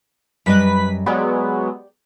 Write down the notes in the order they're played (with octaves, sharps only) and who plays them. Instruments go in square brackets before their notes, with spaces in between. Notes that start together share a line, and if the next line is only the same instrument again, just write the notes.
[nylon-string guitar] F#2 G3 D#5 [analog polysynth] B4 B6
[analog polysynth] F#3 G#3 B3 [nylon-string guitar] G4 D5